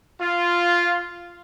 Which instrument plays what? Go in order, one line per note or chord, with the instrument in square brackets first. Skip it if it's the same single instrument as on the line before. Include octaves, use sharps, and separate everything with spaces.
[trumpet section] F4